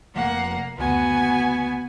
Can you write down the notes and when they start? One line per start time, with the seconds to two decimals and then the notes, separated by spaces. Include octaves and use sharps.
0.16 F1 A#3 F#5
0.78 F#1 D2 B3 F#4 G#5